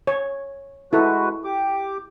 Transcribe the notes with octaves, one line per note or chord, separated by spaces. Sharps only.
C#5
G#3 E4 F#4 A4 B4
G4 D6